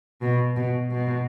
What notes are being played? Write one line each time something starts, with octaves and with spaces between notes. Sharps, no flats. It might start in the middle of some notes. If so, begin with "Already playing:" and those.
B2
B2
B2